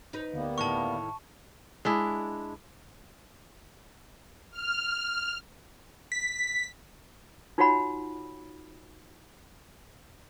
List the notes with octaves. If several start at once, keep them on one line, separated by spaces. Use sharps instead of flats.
D#4 B4
D2 G3 A#3 B3
A2 D#3 E4 A5 C#6
G#3 D4 E4
F6
B6
D#4 F4 F#4 C#5 F#5 B5